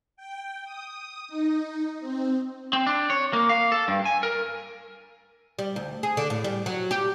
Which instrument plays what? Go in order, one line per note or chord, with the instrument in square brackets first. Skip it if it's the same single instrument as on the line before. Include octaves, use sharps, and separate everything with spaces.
[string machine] G5
D#6
D#4
C4
[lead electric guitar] C4
D4
C#5
A#3
F5
A4
G2
G#5
A#4
[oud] G3
D2
G#4
D3
A2
G3
F#3
G4